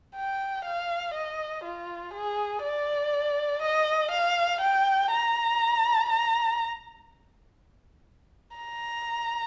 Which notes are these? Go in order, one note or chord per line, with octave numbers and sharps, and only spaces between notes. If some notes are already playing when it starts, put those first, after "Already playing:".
G5
F5
D#5
F4
G#4
D5
D#5
F5
G5
A#5
A#5
A#5